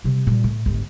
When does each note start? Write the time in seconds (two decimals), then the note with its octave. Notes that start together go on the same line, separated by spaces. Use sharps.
0.04 C3 G3
0.27 A#2 G3
0.44 A2
0.66 G1 G#2